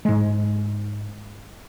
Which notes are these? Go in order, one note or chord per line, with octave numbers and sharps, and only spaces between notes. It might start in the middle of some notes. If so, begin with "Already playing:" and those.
G#2 G#3